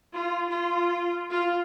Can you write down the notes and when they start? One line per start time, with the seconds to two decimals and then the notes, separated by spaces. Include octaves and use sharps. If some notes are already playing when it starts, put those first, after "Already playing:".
0.12 F4
0.47 F4
1.29 F4